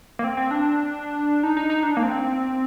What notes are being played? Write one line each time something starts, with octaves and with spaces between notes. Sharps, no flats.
A#3
C4
C4
D4
D#4
D#4
D#4
D4
A#3
C4